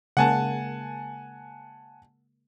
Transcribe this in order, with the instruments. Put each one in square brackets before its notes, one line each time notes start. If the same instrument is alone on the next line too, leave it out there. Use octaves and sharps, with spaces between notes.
[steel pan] C#3 G#3 A#3 [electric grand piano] F#5 G#5 A5